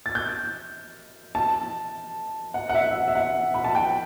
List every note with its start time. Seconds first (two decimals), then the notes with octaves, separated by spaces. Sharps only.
0.06 A6
0.15 G6
1.35 A5
2.54 F#5
2.69 F#5
2.75 E5
2.90 E5
2.95 F#5
3.08 E5
3.15 F#5
3.54 B5
3.64 A5
3.75 G5